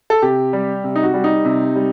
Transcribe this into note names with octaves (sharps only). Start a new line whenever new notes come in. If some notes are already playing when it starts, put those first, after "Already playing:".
A4
C3 G4
G3
C3
D#4
F#4
G3
D#4
C3
G3